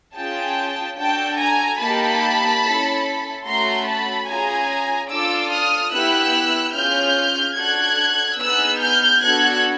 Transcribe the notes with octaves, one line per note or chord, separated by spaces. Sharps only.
C#4 F4 G#4 G5 A5
D4 F#4 A4 G5 A5
G#5 A#5
A#3 D#4 G4 A5 B5
C#4 E4 A4
A3 C#4 F#4 A4 A#5 C6
A5 B5
C#4 F4 G#4 G#5 A#5
D4 F4 A4 D6 E6
D#6 F6
B3 E4 G4 E6 F#6
C#4 F4 G#4 F6 G6
D4 F#4 A4 F#6 G#6
B3 D#4 G#4 E6 F#6
F6 G6
B3 D4 F#4 A4 F#6 G#6